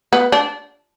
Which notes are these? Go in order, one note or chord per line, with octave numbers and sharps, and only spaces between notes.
B3
D4